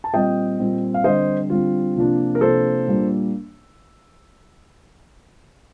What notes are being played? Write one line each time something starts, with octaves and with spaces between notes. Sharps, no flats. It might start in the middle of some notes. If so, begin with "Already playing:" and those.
A5
A#2 G3 C4 D#5 G5
A#2 G3 C4
F5
D3 G3 C4 C5 D#5
D3 G3 C4 F4
C3 F3 A#3 D4
A#4
C3 F3 A#3 D4 A4 C5
A#2 G3 A#3 D4